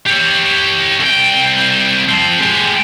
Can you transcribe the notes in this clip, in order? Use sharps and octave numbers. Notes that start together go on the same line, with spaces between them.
G4 C#5
C2 G5
F3 C4
G#3 G4